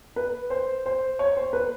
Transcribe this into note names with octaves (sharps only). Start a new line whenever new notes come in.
B4
C5
C5
C#5
C5
B4